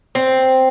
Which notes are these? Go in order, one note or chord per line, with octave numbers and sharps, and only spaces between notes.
C4